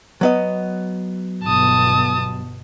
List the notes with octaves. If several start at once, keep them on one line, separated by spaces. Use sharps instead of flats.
F#3 B3 D#5
G1 B2 A5 D#6